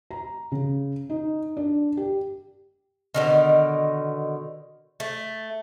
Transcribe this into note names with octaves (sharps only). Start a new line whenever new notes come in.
A#5
C#3
D#4
D4
G4
B2 D3 D#3
A3